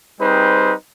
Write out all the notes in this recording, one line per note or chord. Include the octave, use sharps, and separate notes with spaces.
G3 C4 D#4 G#4 B4 C5